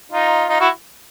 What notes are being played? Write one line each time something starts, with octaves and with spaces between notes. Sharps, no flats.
D#4 F4
D#4 F4
E4 F#4